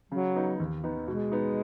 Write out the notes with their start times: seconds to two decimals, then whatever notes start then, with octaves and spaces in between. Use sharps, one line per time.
0.12 C#3 F#3
0.36 B3 D#4
0.60 D#2
0.84 D#3 B3 D#4
1.08 B2 G#3
1.32 B3 D#4